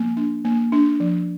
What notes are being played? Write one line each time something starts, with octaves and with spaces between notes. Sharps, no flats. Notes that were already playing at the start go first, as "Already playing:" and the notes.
Already playing: F3 A#3
D4
A#3
D4
F3